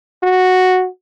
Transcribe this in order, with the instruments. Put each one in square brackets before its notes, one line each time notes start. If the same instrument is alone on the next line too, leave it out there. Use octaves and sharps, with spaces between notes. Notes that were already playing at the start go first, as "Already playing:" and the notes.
[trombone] F#4